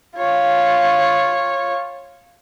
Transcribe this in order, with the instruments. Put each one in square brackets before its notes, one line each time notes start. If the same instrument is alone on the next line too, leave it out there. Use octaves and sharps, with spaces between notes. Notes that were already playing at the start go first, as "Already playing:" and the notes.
[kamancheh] F4 C#5